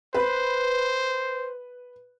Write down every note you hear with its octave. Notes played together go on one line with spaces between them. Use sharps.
B4 C5